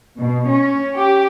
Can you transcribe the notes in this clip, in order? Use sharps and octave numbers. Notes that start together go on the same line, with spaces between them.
B2
C#4
G4